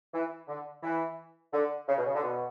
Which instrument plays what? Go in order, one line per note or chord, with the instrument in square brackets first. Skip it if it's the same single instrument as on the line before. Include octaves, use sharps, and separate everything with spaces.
[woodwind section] E3
D3
E3
D3
C#3
B2
C#3
D3
B2